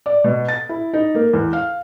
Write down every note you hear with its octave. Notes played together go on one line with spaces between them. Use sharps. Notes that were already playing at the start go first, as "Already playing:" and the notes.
D5
B2
A6
E4
D#4
A#3
E2
F5